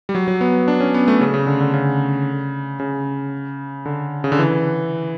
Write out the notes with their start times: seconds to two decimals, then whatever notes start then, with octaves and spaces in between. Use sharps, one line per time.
0.09 G3
0.15 F#3
0.28 F#3
0.41 B3
0.68 D4
0.81 C#4
0.94 B3
1.08 A3
1.21 C#3
1.34 C#3
1.47 D3
1.61 D3
1.74 C#3
2.80 C#3
3.86 D3
4.24 C#3
4.32 D3
4.39 E3